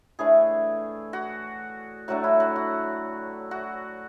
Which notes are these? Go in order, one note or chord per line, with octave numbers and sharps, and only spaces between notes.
A2 E3 A3 D4 G#4
F#4
A2 F#3 A3 D4 F#4
E4
F#4
F#4
F#4